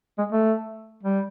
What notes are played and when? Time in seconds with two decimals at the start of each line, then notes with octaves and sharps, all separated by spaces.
0.18 G#3
0.32 A3
1.03 G3